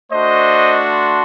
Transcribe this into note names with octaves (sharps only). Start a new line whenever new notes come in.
A3 D4 F#4 C5 D#5
A5 C6